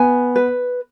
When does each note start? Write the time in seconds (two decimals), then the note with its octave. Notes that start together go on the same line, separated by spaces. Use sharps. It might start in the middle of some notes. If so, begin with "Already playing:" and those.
Already playing: B3 G#5
0.36 B4